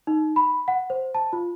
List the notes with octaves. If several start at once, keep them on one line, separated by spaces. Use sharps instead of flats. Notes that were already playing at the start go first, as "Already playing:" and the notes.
D#4
B5
F#5
C5
A5
F4